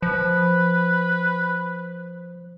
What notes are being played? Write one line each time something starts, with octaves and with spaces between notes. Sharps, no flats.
F3 B4